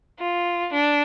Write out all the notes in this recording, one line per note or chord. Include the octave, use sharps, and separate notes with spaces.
F4
D4